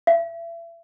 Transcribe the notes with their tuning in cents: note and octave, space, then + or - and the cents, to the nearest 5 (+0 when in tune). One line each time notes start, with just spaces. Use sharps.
E5 +35